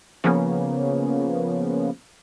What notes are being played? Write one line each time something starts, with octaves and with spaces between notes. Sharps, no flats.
C#3 F3 A#3 B3 C#4